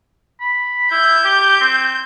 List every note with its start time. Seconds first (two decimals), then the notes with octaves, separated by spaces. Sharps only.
0.41 B5
0.91 E4 G6
1.24 G4
1.61 C4